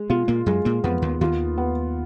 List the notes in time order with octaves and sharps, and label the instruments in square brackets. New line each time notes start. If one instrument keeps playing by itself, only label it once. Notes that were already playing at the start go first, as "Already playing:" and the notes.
Already playing: [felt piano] G#3
[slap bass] B2 B3 [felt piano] F4
[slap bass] A#2 A#3
[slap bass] F#2 F#3 [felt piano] G#3
[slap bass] A#2 A#3
[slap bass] F2 F3 [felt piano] B3
[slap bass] D#2 D#3
[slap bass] D#2 D#3 [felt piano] F4
[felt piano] B3